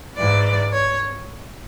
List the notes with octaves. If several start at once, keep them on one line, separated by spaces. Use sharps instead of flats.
G#2 E3 D5
C#5